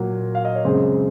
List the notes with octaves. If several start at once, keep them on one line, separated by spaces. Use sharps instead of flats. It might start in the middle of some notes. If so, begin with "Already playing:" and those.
Already playing: A#2 F#3 A#3
F5
D#5
C#5
F#2 C#3 G#3 C4 C5